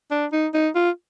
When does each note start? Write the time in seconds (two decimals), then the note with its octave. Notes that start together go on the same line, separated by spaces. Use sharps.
0.11 D4
0.32 D#4
0.54 D#4
0.75 F4